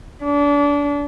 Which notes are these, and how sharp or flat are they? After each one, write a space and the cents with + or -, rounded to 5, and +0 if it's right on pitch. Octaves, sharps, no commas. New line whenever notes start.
D4 -30